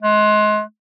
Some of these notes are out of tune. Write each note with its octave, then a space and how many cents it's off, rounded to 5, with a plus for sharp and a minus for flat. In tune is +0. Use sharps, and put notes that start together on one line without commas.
G#3 +30